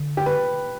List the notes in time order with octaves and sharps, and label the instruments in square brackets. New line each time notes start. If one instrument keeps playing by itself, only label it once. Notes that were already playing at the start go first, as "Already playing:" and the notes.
Already playing: [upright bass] D3
[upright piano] G4
B4